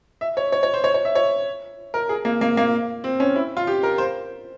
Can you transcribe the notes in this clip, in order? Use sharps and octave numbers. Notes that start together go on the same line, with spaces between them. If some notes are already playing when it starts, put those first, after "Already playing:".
E5
C#5
C#5
C#5
C5
C#5
C#5
E5
C#5
A#4
G#4
A#3
A#3
A#3
C4
C#4
E4
F4
G4
A#4
C5